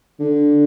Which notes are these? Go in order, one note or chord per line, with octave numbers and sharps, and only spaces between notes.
D3